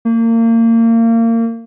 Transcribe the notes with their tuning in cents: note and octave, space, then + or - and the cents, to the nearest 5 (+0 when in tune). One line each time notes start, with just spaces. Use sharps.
A#3 -30